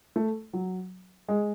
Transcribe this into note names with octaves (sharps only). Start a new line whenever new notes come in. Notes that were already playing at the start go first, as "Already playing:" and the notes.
A3
F#3
G#3